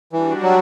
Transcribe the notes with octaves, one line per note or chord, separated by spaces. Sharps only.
E3 G3 D4 F#4
F#3